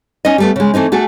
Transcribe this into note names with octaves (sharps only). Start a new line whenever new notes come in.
C#4 D#4 D#5
G3 A3 B3
C#3 G#3
E3 A3 C4 D#4
A3 F#4 G#4 A4